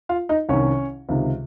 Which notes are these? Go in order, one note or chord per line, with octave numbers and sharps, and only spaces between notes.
F4 F5
D#4 D#5
C2 C3 D#3 C#4 C#5
C#2 C3 D#3